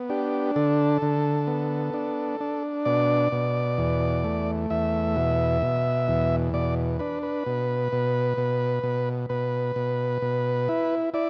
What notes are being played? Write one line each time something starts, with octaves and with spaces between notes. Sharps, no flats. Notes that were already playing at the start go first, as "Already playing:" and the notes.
Already playing: B3
D4 G4
D3 A4
D3
B3
D4
D4
B2 D5
B2
E2
A3
E2 E5
B2
B2
E2
B2 D5
D4 B4
B4
B2
B2
B2
B2
B2 B4
B2
B2
E4
E4 D5